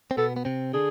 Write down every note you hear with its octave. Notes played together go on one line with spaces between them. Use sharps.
C4
B2 B3 A4
B3
C3 C4
D3 D4 G#4